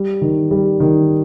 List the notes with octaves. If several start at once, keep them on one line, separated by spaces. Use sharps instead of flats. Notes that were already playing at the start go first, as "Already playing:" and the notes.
Already playing: G3
D#3
G3
D#3